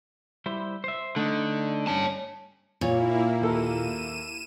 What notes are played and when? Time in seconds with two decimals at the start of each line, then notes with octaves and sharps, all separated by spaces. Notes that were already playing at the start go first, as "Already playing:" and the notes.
0.46 G3 E4 C5
0.84 C5 E5
1.16 D3 A3 D#4
1.87 G2 C#4 C#5 A5
2.81 A#2 A#3 E4 C#5
3.41 D#2 A4 A#4 D#7 E7